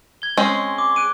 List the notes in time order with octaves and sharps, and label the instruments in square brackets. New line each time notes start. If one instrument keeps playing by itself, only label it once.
[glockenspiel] G#6 G7
[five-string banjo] G#3 C4 C#4
[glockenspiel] D6
F#6 D7 D#7